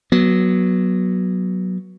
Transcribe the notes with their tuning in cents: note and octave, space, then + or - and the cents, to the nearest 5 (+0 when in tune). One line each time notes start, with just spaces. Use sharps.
F#3 +0 B3 -25